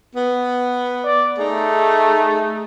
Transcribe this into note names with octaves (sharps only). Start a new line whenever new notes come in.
B3
D5
A3 D#4 G#4